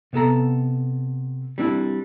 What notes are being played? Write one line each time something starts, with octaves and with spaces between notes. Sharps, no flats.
C3 B3 A4 A#5
G3 C4 D4 E4